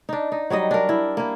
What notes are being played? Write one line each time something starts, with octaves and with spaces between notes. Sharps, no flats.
D4 D#4
D#4
F#3 G3 D#4 D#5
D4 A#4
E4
A#3 E4